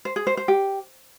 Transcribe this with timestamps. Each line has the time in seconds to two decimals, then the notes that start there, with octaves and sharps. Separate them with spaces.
0.05 C5
0.16 G#4
0.27 C5
0.37 C5
0.48 G4